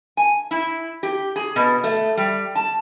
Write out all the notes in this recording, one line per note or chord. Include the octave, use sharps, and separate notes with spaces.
G#5
E4
G4
G#4
B2
A3
G3
A5